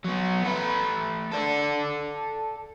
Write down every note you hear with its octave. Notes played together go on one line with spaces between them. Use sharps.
F#3 B3
A3 B4
A4 D5